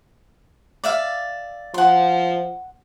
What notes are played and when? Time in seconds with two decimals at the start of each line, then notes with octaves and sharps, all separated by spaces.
0.84 D5 E5 F5
1.74 F3 F#5 C6